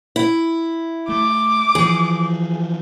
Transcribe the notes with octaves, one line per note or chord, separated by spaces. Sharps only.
E4
A3 D6
E3 F3 G#4